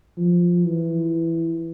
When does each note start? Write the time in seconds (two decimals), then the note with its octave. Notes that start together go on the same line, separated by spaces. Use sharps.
0.17 F3
0.65 E3